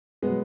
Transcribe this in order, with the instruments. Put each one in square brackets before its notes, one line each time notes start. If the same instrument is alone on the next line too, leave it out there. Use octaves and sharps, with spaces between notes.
[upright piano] B2 F#3 G#3 B3